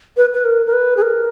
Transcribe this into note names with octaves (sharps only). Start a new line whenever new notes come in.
B4
B4
A#4
A#4
B4
G#4
A#4